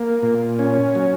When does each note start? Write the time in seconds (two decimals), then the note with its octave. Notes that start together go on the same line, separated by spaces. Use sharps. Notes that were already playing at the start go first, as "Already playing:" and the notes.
Already playing: A#3
0.22 A#2
0.59 C#4
0.95 F#3